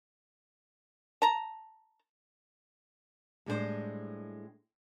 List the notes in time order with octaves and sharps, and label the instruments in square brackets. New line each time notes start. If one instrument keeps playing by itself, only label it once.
[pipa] A5 A#5
[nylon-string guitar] A2 G3 G#3 D4 A4 C5